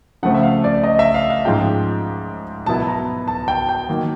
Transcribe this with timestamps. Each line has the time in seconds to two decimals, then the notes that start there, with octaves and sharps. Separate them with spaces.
0.23 C#3 F3 A3 C4 F#5
0.34 E5
0.43 F5
0.64 D5
0.84 D#5
0.99 E5
1.14 F5
1.30 F5
1.45 G#2 F3 G#3 C#4 F4 G5
2.66 B2 F#3 B3 E4 A5
2.87 A#5
3.28 A5
3.48 G5
3.69 G5
3.89 D#3 F#3 A#3